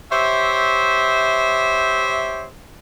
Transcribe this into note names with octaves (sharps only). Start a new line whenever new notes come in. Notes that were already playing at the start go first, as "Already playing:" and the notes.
G4 C5 C#5 E5